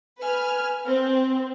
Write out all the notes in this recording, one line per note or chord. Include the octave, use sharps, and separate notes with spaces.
B4 G#5 F6
C4